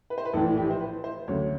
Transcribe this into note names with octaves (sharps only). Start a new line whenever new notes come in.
B4
C5
B4
A#1 A2 E3 A4
G4
C5
B4
C5
D2 C#3 F#3 C#5